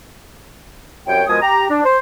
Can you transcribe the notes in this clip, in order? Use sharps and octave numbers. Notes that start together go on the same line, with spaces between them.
C2 F#2 C#5 G5
B2 F3 G#3 A#4 G#5 D#6
G4 A#5
D4
C5